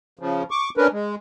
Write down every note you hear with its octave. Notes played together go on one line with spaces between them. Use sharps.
C#3 F3
C#6 D6
C#4 D4 A#4 B4
G#3